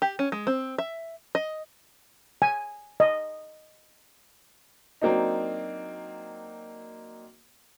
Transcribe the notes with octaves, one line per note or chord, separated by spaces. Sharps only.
G4
C#4
G#3
C4
E5
D#5
G#5
D#5
F#3 A#3 C4 D4 D#4